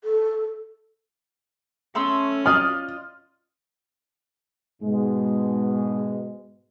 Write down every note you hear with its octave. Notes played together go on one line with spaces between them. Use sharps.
A4
A3 C#4 C6 E6
F4 D5 D#5 F6
G#2 B2 G#3